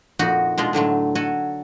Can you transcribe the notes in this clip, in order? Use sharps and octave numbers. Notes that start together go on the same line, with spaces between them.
F2 A#2 D#4 F#4
B2 G#3 D4 F4
A2 D3 F#3 A3
F#4 A4 F#5 G#5